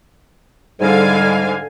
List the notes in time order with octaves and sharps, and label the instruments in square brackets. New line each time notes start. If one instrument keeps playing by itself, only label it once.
[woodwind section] G#2 G3 [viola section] D3 F5 G#5